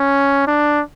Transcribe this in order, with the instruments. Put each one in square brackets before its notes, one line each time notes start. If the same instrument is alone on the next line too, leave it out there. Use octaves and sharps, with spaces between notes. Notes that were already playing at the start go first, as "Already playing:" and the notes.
Already playing: [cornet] C#4
D4